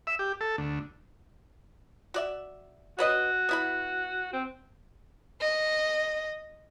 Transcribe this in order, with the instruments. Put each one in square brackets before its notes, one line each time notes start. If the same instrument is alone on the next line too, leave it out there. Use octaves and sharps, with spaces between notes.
[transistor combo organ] E5
G4
A4
D2
[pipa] F#4 D5 E5
[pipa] C#4 B4 D#5 [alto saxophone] F#4
[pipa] B3 E4 B5
[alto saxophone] C4
[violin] D#5